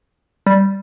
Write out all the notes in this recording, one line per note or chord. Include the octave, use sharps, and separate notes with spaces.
G3